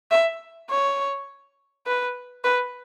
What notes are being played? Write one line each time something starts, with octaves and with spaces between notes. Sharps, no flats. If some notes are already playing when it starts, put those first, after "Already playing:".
E5
C#5
B4
B4